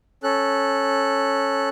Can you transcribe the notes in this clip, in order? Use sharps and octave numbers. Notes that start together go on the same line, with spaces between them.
C#4 A4 F#6